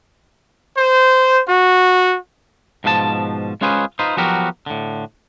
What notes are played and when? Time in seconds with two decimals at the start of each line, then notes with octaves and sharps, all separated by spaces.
0.77 C5
1.48 F#4
2.84 G#2 B2 F3 B4 A5
3.61 G#3 C#4 F4 G#4 B4 C5
3.99 D#4 F4 B4 C5
4.17 F3 F#3 B3 F#4 G4 A#4
4.66 A2 D3